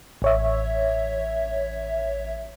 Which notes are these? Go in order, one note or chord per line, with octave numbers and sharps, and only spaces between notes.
A1 C#5 E5